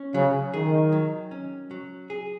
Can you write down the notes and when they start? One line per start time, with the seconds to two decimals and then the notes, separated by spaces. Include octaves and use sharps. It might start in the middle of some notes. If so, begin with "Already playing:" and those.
Already playing: C#4
0.14 C#3 F#3
0.54 D#3 G#4
0.93 F#3
1.31 C#4
1.71 F#3
2.10 G#4